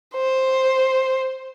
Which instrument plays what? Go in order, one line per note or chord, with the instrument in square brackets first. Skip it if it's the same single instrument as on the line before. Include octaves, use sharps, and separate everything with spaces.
[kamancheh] C5